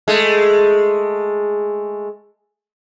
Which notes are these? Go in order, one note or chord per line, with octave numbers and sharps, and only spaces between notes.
G#3 A3